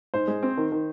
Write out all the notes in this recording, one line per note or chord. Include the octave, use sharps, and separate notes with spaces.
G#2 C5
G#3
C4
D#3
D#3